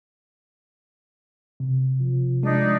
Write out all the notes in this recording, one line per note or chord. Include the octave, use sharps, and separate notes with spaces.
C3
F3
G#3 D4 D#4